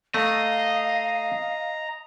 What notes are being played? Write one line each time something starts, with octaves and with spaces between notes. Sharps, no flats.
A3 D#5 F5 A#5